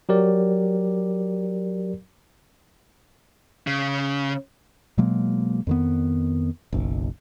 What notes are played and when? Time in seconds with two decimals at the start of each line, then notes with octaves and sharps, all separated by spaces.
0.09 F#3 G4 A#4 D5
3.67 C#3
4.98 B2 F#3 G#3 A#3
5.67 F2 D#3 B3
6.72 F#1 B1